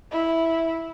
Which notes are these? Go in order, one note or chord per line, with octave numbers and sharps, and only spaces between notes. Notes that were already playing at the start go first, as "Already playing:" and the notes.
E4